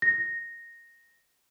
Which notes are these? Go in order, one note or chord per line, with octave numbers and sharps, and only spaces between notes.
A#6